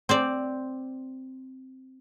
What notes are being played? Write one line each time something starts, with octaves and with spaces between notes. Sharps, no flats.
C4 C5 D5